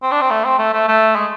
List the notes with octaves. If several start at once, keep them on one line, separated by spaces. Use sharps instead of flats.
C4
D4
C4
A3
C4
A3
A3
A3
G#3